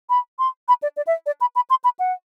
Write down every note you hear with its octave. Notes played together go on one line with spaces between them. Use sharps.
B5
C6
B5
D5
D5
E5
D5
B5
B5
C6
B5
F#5